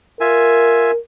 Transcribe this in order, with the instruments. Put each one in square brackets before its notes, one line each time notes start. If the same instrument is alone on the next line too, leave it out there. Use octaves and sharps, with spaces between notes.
[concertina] F4 E5 G#5 [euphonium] A#4